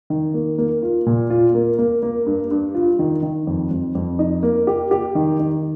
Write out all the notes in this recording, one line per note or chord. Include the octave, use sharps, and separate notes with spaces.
D#3
A#3
A#3
F4
A#2
F4
A#3
A#3
A#3
G2
G2
F4
D#3
D#3
F2
F2
F2
D#4
A#3
G4
G4
D#3
D#3